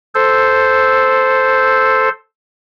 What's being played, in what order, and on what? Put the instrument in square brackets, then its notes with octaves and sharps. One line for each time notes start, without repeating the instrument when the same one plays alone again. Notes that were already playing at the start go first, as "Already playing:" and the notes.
[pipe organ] A4 C5